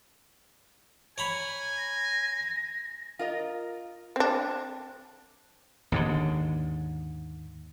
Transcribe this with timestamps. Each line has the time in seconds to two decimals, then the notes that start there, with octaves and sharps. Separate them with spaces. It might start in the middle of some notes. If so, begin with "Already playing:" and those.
1.18 C#5 G#5 A#5 B5
1.78 A#6
3.19 F4 A#4 D#5
4.16 C4 D4
5.92 D#2 G#2 D3